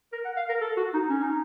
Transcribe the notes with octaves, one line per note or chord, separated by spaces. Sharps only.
A#4
F#5
F5
A#4
A4
F#4
D#4
C#4
D#4